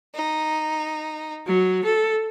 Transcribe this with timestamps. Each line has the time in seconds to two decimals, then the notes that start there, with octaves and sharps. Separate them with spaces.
0.14 D#4
1.47 F#3
1.83 A4